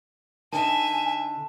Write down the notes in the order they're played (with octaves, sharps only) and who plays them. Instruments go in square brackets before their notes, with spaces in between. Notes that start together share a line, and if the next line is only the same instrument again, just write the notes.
[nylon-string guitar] D3 D#4 A#4 [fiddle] E5 [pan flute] G#5 [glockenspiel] A5